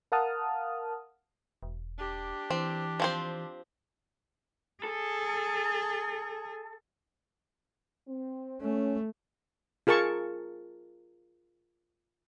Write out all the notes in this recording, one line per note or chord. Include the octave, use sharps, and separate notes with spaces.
A#4 F5 F#5 A5 D#6 F6
E1
D4 G4
E3 C4
F3 C4 C5
G#4 A4
C4
A3 C#4
F4 G#4 A#4 A5 C#6